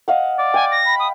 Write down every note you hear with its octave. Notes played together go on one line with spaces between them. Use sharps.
D#5 F5 F#5
D5
G5 G#5
A#6
B5
D#6